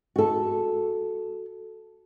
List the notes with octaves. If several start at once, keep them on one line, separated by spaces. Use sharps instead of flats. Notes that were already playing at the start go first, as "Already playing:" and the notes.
F#4 A4